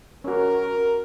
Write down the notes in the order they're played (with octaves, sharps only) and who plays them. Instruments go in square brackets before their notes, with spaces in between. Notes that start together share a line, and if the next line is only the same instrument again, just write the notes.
[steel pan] C#4 F#4 [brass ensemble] A#4